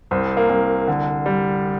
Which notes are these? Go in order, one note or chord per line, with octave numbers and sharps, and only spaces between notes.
C2 C4
A#3
C2
D3
G3